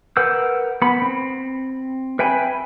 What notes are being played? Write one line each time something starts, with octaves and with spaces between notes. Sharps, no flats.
A#4 B4 F#5 E6 G6
B3 B5
C4
B4 E5 G5 G#5 B5